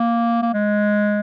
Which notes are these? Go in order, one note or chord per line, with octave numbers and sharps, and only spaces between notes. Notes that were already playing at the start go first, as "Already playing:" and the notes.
Already playing: A#3
A#3
G#3